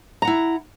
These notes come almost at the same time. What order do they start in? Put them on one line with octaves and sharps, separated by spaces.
A#5 F#5 E4